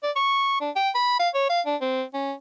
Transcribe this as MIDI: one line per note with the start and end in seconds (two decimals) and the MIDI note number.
0.03 0.11 74
0.16 0.57 85
0.61 0.70 62
0.76 0.90 79
0.95 1.16 83
1.19 1.29 77
1.34 1.48 73
1.49 1.61 77
1.66 1.76 62
1.81 2.03 60
2.14 2.33 61